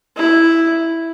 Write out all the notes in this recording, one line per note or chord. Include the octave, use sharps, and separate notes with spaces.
E4